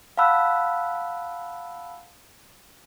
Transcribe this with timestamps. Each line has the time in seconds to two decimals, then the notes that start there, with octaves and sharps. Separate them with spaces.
0.17 F5 F#5 A5 B5 E6 F#6